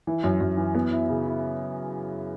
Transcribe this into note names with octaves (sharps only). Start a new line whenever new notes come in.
E3
F#2
F#2
E3
B3
E4
C#3
E4